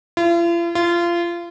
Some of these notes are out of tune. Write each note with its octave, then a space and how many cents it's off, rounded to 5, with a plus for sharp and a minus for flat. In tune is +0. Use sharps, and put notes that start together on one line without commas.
F4 -45
F4 -25